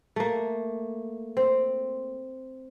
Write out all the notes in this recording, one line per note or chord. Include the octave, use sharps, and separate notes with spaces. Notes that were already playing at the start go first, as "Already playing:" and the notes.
A3 A#3
C4